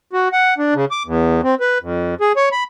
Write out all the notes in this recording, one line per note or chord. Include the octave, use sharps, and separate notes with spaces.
F#4
F#5
D4
C#3
D6
E2
C4
B4
F2
G#4
C#5
B5